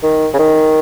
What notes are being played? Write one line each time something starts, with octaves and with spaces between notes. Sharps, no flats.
D#3
C#3
D#3